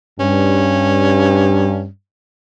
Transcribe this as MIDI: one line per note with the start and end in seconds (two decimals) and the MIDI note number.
0.20 1.87 43
0.20 1.86 61